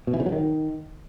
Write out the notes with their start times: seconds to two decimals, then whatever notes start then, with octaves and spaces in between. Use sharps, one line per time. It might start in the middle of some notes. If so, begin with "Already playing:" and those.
0.07 B2
0.14 E3
0.20 C#3
0.26 F#3
0.32 D#3